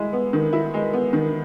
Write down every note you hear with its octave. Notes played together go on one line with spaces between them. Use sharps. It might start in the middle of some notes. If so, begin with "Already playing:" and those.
Already playing: G#3 E4
B3
D#3
E4
G#3
B3
D#3